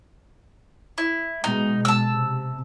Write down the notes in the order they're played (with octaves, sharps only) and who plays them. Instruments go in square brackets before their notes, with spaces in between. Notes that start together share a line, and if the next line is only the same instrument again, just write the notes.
[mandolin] E4
[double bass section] B2 G#3 [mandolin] D#4
[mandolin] A5 E6
[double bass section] C3